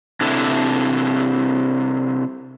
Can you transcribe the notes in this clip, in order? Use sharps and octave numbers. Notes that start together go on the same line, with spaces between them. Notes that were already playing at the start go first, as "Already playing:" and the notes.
C3 D4 E4 A4